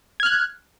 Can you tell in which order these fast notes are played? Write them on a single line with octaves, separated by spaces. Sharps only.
G#6 F6 F#6